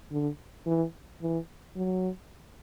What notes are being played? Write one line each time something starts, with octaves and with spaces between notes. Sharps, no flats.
D3
E3
E3
F#3